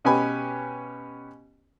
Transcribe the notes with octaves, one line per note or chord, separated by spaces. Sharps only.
B2 C#4 G4 B4 G#5 B5